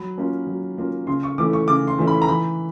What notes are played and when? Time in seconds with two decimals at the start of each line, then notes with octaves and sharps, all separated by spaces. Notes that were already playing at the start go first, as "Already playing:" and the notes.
Already playing: F#3 B5
0.18 A#3 C#4 F4
0.47 F#3
0.77 A#3 C#4 F4
1.07 C#3 C6
1.23 C#6
1.38 E3 A3 C#4 E4 D6
1.53 C#6
1.68 C#3 D6
1.88 C6
1.98 E3 A3 C#4 E4
2.07 B5
2.22 A#5
2.28 E3 B5